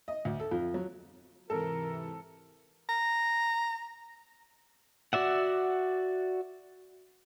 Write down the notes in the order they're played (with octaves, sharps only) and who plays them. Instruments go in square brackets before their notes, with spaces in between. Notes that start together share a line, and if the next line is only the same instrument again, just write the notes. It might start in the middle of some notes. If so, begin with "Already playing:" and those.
[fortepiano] D#5
D2
A4
F2
F#3
[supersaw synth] G#2 C3 E3 [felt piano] A4 [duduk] A#4
[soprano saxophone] A#5
[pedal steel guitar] F#4 D5 E5 F#5